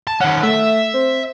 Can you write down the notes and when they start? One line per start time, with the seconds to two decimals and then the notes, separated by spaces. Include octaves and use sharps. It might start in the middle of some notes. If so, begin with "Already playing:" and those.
0.07 A5
0.21 D#3 C#4 F#5
0.43 A3 E5
0.94 C4